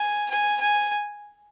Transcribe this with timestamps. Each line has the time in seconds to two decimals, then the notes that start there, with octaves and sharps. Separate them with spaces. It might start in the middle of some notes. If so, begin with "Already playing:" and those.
Already playing: G#5
0.30 G#5
0.60 G#5